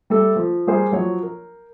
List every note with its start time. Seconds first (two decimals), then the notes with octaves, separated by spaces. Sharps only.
0.10 G3 A3 A4
0.36 F3
0.67 G3 G4 G#4 A#4 C5
0.91 F3 F#3 C#5
1.23 A#4